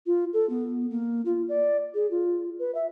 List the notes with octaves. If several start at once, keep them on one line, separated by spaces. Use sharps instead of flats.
F4
A4
B3
A#3
F4
D5
G#4
F4
B4
E5